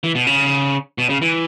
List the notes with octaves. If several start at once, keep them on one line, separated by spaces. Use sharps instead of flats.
E3
B2
C#3
B2
C#3
E3